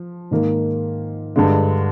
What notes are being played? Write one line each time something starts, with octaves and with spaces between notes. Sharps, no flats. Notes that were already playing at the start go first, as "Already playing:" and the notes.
Already playing: F3
G#2 D#3 A#3
G2 D3 G#3